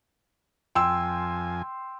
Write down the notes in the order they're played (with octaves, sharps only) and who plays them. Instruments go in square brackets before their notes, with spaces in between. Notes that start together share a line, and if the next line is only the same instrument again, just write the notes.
[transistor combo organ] F2 G#5 [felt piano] G5 C6 E6